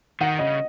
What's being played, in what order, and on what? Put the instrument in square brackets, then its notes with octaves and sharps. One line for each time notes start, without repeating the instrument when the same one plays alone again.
[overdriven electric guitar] D#3 [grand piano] F#5
[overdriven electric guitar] C#3 [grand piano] D#5